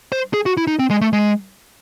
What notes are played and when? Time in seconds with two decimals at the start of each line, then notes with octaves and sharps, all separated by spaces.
0.12 C5
0.34 G#4
0.46 F#4
0.57 E4
0.67 D#4
0.79 C4
0.90 G#3
1.01 A3
1.13 G#3